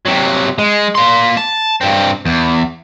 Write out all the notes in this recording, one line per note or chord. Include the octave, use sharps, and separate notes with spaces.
C3 F#3
G#3
A#3 C6
A5
G2 C4
E2